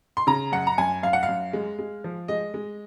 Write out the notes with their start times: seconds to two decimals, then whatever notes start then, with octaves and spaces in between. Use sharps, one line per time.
0.17 C6
0.27 C#3 A#5
0.52 F#2 F#5
0.67 A#5
0.78 F#2 G#5
1.03 F#2 F5
1.13 F#5
1.23 F5
1.28 F#2
1.53 G#3
1.79 G#3
2.04 F3
2.28 G#3 D#5
2.54 G#3